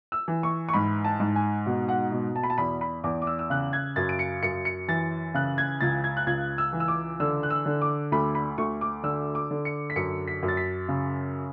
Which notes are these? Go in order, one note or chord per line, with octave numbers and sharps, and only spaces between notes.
E6
E3
C#6
C#6
G#2 B5
A5
G#2
G#5
B2 F#5
F#5
B2
A5
B5
A5
E2 B5
B5
E2 D6
D6
E6
E6
C#3 F#6
G#6
F#2 A6
D7
C#7
F#2 C#7
C#7
E3 A6
C#3 F#6
G#6
C#2 A6
G#6
F#6
C#2 G#6
E6
E3
E6
D6
D3 E6
F#6
E6
D3
D6
D2 B5
B5
D2 C#6
D6
D3 E6
D6
D3
C#7
B6
F#2 C#7
B6
F#2
A6
B6
C#3